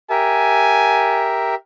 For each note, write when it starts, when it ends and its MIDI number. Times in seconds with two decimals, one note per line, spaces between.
0.10 1.55 67
0.10 1.55 70
0.10 1.55 76
0.10 1.38 80